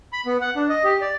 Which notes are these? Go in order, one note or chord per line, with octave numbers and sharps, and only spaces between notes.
B5
B3
F#5
D4
D#5
G4
D5